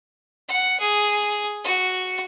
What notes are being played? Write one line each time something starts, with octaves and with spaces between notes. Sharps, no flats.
F#5
G#4
F#4